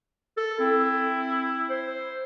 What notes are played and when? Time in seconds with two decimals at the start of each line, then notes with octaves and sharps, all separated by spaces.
0.37 A4
0.59 C4 E4
1.70 C5